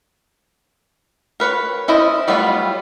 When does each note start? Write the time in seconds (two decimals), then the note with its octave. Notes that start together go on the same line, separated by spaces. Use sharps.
1.40 A#4 B4 C#5
1.88 C#4 E4 C5 D#5 A5
2.28 F#3 G3 A3 B3 F4